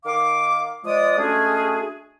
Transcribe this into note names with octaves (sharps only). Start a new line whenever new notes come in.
D#3 F5 D6
F3 G#3 D5 D#6
G#3 A3 C#4 D4 F#4 G#4